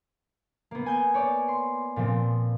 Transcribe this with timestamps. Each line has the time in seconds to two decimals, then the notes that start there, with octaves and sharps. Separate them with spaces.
0.71 A#3 B3
0.86 G#5 G6
1.14 C#5 D5
1.48 C6
1.96 A#2 F3 C4